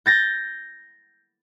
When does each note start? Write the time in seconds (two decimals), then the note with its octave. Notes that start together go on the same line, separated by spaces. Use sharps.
0.06 G6 A6 A#6